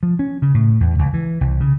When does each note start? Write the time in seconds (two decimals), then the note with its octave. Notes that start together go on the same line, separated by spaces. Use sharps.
0.03 F3
0.19 C#4
0.42 C#3
0.54 A2
0.81 E2
0.99 C#2
1.14 E3
1.41 C2
1.60 C#3